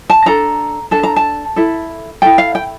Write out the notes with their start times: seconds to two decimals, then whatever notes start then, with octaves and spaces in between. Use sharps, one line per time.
0.10 A5
0.26 D4 A4 A#5
0.91 D4 A4 A5
1.03 A#5
1.16 A5
1.56 E4 A4
2.22 E4 A4 G5
2.38 F5
2.55 G5